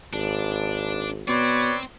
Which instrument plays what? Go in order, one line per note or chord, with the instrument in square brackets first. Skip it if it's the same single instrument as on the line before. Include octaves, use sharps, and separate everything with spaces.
[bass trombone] G#1 [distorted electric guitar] D4
[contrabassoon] B2 [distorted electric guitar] C4 [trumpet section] B4 C#5 D5